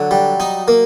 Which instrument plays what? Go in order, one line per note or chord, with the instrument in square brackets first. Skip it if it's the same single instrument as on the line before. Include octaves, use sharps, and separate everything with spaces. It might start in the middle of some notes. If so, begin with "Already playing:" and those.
Already playing: [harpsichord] D3 [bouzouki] F#3
[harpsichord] G3
D#4
A#3